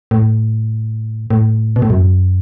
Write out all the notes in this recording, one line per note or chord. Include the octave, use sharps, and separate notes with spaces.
A2
A2
B2
A2
F#2